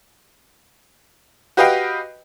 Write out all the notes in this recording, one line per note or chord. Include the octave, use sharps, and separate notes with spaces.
F#4 G4 B4 D#5 F5 G5